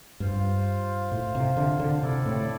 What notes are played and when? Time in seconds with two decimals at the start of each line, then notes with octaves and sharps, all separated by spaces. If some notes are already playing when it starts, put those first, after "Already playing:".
0.20 G2 F4 C5 F5
1.12 A2
1.35 C3
1.57 D3
1.80 D3
2.03 C3 E4 A4 D5
2.25 A2